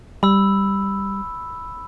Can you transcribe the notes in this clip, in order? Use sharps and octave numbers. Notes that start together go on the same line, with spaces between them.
G3 B5 E6